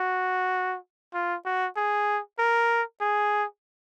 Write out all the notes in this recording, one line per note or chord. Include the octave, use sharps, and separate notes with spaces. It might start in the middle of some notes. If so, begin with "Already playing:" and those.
Already playing: F#4
F4
F#4
G#4
A#4
G#4